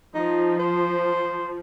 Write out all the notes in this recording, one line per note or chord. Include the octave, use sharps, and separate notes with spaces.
F3 D#4
C5